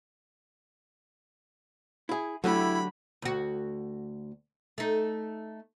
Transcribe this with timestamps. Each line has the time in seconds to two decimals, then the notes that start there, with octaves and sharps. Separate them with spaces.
2.09 E4 G#4
2.44 D3 F#3 A3 E4 G4 B5
3.22 D2 F#4
4.78 A3 D#4